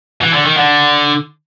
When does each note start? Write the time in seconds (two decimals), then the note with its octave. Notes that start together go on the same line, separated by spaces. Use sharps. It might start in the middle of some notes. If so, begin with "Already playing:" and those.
0.21 E3
0.33 D3
0.45 D#3
0.57 D3